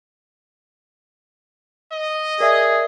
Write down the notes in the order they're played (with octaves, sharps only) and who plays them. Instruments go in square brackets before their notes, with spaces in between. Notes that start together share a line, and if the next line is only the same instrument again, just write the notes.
[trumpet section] D#5
[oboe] G#4 [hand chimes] A#4 D5 E5